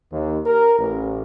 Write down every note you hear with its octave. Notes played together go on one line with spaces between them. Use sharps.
D#2
A#4
A1